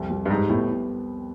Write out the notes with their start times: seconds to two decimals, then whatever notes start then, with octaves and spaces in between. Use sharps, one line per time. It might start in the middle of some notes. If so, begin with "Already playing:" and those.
Already playing: C2 F2
0.10 C2
0.25 G2
0.30 G#2 G3
0.49 A2 B3